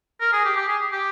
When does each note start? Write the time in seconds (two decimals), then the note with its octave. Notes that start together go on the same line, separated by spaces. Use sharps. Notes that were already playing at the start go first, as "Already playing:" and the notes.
0.21 A#4
0.33 G#4
0.45 G4
0.57 G4
0.68 G#4
0.92 G4